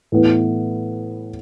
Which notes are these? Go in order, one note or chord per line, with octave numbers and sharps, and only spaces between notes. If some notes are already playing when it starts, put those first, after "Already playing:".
A2 E3 B3